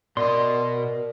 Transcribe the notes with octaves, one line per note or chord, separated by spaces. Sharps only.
B2 A#4 D5 D#5 C6